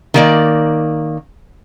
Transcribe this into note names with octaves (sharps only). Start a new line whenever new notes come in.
D#3 A#3 D5